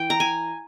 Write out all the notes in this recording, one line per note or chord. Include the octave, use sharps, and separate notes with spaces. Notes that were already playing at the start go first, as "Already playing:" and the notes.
Already playing: E3 G5
A#5
G#5